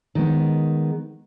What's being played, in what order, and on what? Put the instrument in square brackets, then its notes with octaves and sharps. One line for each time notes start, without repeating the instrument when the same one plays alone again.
[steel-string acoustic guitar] D#3 G#3 B3